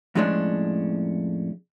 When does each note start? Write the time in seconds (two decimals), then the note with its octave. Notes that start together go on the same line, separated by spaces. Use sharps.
0.15 F2 A2 F3 G#3 C#4 D4